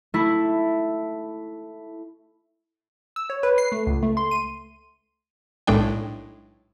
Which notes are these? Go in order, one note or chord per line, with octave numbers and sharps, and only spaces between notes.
A3 E4
E6
C#5
B4
C7
A3
C#2
A3
C6
D#7
B1 A2 G#3 D4 G5